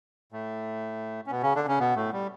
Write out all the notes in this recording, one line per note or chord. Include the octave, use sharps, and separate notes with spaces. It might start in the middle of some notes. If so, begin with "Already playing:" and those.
A2 A3
C#4
B2 B3
C#3 C#4
D3 D4
C#3 C#4
B2 B3
A2 A3
G3